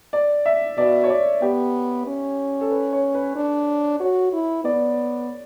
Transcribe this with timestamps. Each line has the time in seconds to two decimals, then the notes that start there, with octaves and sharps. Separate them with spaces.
0.13 D5
0.46 E5
0.77 B2 D5
1.04 C#5
1.10 D5
1.42 B3 G4
2.07 C#4
2.61 A4
2.71 B4
2.93 C#5
3.14 B4
3.36 D4
4.00 F#4 C#5
4.33 E4
4.64 B3 D5